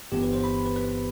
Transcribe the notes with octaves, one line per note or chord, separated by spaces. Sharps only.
G1 G2 E3 B3 G4
B4
C5
B5
B4
B4